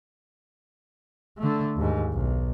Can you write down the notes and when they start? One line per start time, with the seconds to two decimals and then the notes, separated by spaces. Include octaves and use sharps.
1.38 D3 A3
1.76 D#2 G#2
2.12 B1